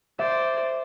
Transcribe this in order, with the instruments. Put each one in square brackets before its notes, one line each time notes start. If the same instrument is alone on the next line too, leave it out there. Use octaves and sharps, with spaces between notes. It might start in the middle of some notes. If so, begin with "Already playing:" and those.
[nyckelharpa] C5 D5 [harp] E5